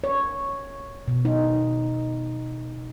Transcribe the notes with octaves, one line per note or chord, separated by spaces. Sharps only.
C#5
B2
D#4